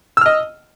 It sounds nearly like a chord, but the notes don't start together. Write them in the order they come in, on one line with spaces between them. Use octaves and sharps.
E6 F6 D#5